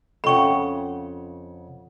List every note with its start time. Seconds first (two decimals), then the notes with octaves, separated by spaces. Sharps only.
0.24 F2 C#3 A4 F#5 G5 B5 C#6